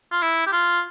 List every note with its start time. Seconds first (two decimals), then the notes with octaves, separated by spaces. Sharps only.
0.12 F4
0.22 E4
0.47 G4
0.52 F4